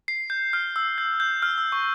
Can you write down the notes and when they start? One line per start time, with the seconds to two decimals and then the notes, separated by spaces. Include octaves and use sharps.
0.08 C7
0.30 G6
0.53 F6
0.76 E6
0.98 G6
1.20 G6
1.42 F6
1.58 E6
1.72 C#6